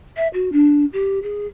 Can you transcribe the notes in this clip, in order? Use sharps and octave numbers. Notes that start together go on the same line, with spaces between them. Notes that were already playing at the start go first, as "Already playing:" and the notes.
E5
F#4
D4
G4
G#4